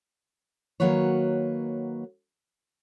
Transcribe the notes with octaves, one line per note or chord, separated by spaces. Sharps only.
D#3 F#3 A#3 F#4 B4 C#5